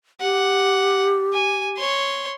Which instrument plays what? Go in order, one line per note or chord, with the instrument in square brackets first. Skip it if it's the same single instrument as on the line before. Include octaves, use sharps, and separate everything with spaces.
[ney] G4 [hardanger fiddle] F#5
[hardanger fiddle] G#5
C#5 C6